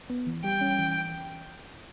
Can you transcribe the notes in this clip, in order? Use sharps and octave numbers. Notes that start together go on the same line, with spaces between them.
B3
E3
G3 G5
C#4
E3